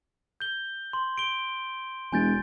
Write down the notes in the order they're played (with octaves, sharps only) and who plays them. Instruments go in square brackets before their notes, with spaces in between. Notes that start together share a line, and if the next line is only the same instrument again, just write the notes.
[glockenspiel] G6 G7
C6
D7 G7
[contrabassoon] E1 [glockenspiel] G#5 G6 A6